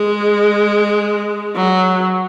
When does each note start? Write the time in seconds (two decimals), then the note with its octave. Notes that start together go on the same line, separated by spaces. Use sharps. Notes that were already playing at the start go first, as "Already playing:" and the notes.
Already playing: G#3
1.56 F#3